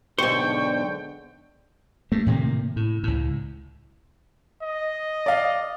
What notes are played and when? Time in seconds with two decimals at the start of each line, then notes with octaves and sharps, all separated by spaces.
0.18 B1 G#2 D3 C5 G5 C#6
2.12 G2 A3
2.26 A2 C3 D#3 A#3
2.76 A2
3.03 C#2 A2
4.63 D#5
5.26 D5 F5